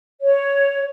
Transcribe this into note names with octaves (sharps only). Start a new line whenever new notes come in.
C#5